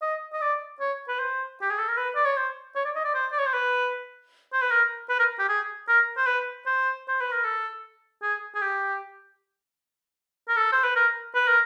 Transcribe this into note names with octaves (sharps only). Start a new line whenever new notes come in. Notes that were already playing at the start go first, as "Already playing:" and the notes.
D#5
D#5
D5
C#5
B4
C5
G4
G#4
A4
A#4
B4
D5
C#5
C5
C#5
D5
D#5
D5
C5
D5
C#5
C5
B4
C5
B4
A#4
B4
A#4
G4
G#4
A#4
C5
B4
C5
C5
B4
A#4
A4
G#4
G#4
G4
A#4
A4
C5
B4
A#4
B4
A#4